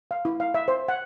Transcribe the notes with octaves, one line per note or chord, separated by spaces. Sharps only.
F5
E4
F5
E5
C5
F#5